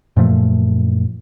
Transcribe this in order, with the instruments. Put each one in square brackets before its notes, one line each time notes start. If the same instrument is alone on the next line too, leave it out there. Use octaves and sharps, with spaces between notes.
[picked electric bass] F#2 A#2 F3 A3